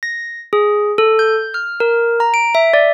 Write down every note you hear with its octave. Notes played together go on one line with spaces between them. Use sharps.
A#6
G#4
A4
G6
F6
A#4
A#5
D7
E5
D5